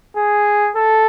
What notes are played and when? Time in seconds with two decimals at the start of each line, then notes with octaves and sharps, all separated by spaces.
0.17 G#4
0.76 A4